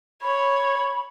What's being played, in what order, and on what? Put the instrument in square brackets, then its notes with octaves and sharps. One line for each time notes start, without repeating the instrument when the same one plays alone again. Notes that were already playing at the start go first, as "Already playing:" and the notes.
[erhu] C#5 [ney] B5